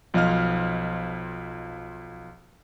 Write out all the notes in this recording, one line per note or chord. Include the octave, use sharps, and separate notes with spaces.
B1 F3 D#5 F5 F6